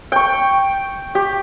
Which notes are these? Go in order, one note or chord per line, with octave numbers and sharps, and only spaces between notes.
G5 C#6
G4